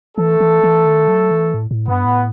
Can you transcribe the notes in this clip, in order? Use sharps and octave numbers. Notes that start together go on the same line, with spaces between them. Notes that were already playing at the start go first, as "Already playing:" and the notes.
E3 A3 A4
E3
E3
D#3
F#3
E3
A2
A2
G2 B3
A2